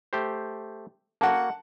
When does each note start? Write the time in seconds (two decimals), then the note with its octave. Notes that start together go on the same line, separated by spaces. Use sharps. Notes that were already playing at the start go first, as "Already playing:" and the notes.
0.13 A3 G4 C5
1.21 A#3 F#4 F#5 A5